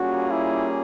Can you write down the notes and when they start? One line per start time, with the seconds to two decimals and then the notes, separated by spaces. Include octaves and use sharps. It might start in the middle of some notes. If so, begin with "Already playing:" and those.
Already playing: G3 A#3 C#4 F4 F#4 G#4
0.31 E4